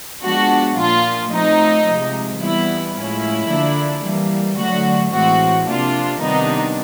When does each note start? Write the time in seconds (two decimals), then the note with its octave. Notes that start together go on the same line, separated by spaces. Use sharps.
0.24 F3 G#3 B3 D4 F#4
0.78 A#2 F3 A#3 F4
1.33 F3 A3 C4 D#4
1.87 C3 F3 G#3
2.41 E3 G3 B3 E4
2.95 A2 F3 G#3 C#4 E4
3.50 D3 F3 A#3 D4
4.05 E3 G3 A#3
4.58 D3 F#3 A3 F#4
5.12 A2 E3 G#3 C4 F#4
5.68 C3 F3 A#3 D4 F4
6.21 C3 D#3 G3 B3 D4 D#4